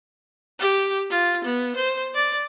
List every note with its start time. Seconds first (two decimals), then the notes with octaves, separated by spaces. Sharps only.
0.60 G4
1.10 F4
1.44 B3
1.76 C5
2.15 D5